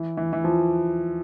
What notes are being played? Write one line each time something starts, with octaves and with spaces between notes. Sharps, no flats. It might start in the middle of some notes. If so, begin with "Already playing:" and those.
Already playing: E3
E3
E3
F3